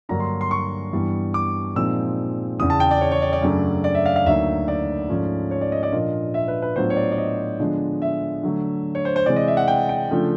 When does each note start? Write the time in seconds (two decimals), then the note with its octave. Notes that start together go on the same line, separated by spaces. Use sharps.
0.09 G2 D3 F#3 A#3 D4 A#5
0.20 C6
0.41 C6
0.51 C#6
0.93 G2 E3 G3 B3
1.34 D6
1.75 A#2 F3 G#3 C4 D#4 E6
2.59 E2 C#3 E3 D#6
2.70 A5
2.80 G5
2.91 D5
3.01 C#5
3.11 C#5
3.22 D5
3.33 D5
3.42 F#2 C#3 F#3 A3 D4
3.84 D5
3.95 E5
4.06 F5
4.16 F5
4.26 D2 D3 F#3 A#3 D#4 E5
4.68 D5
5.09 G#2 F3 A3 C#4
5.51 C#5
5.61 D5
5.72 D#5
5.83 D5
5.92 A#2 F3 A#3 D4 F4 D#5
6.34 E5
6.48 B4
6.62 B4
6.76 A2 F#3 B3 D4 F4 C5
6.90 C#5
6.96 D5
7.12 D5
7.18 D#5
7.59 D3 F3 G#3 B3 D4
8.02 E5
8.43 D3 F#3 A3
8.95 C#5
9.05 C5
9.16 C5
9.26 C3 E3 G#3 D5
9.36 D#5
9.48 E5
9.57 F#5
9.68 G5
9.89 G5
10.10 C#3 F3 A3 D4 F4